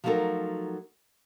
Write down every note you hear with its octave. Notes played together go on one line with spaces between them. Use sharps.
F3 F#3 A3 D#4 A4 A#4